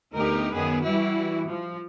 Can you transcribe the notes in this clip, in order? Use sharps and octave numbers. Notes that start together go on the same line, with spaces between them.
D2 B3 D#4 G4 A#4
F#2 D#3 B3 G#4 B4
E3 G3 E4 F#4
F3